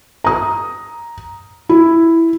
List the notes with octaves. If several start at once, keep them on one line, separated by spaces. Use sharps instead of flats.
A#5 D#6
E4